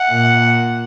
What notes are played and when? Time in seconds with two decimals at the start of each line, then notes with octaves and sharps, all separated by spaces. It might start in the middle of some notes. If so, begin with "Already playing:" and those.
Already playing: F#5
0.10 A#2